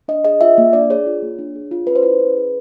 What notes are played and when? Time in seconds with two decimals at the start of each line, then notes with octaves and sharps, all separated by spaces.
0.08 D4 D#5
0.25 G#4 D#5
0.41 F4 E5
0.58 A#3
0.73 D4 D5
0.90 G#4 C#5
1.06 F4
1.22 A#3
1.39 D4
1.55 G#4
1.71 F4
1.87 C#4 B4
1.96 C5
2.03 E4 B4
2.20 C#4
2.37 G#4